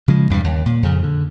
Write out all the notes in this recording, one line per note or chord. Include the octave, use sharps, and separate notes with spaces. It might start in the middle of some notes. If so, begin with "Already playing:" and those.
C#3 F3 G#3
E2 G2 C3 G3
D#2
A#2
F2 C#3
D3